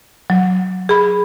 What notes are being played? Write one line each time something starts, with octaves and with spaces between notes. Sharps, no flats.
F#3
G#4 B5